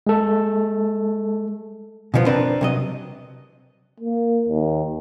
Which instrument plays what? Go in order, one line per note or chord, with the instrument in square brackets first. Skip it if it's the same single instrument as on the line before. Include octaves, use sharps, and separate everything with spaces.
[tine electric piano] G#3 A4
[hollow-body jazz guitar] B2 D3 F3 B3
C4 D4 A#4 B4
C3 F#3 D#5
[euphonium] A#3
D#2